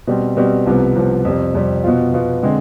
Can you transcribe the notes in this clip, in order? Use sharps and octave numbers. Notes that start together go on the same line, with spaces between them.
B2 G3 C4
B2 G3 C4
C2 C3 F3 B3
C2 C3 F3 B3
F2 C3 G3
F2 C3 G3
B2 B3 F4
B2 B3 F4
D3 G#3 C4